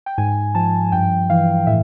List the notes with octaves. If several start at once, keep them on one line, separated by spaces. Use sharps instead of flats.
G5
G#2 G#5
F3 A5
G2 G5
E3 F5
A2 E5